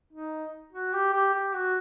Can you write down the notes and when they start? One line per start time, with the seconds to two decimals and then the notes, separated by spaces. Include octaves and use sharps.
0.13 D#4
0.73 F#4
0.93 G4
1.13 G4
1.34 G4
1.54 F#4